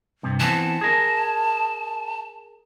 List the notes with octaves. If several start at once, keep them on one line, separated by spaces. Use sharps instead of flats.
G2 C3
E3 B3 C4 A5
G#4 A#4